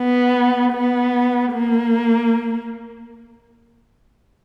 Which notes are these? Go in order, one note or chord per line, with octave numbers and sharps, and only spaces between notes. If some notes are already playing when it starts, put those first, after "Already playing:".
Already playing: B3
B3
A#3